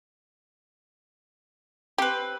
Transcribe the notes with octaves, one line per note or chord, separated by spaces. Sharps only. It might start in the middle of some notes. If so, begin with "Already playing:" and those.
C4 G4 B4